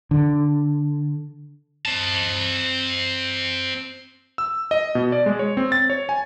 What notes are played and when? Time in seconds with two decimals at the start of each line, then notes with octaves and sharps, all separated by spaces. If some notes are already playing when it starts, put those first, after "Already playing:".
0.11 D3
1.86 C4 A5
4.38 E6
4.71 D#5
4.95 B2
5.12 D5
5.26 G#3
5.39 C#5
5.57 C4
5.72 A6
5.90 C#5
6.09 G#5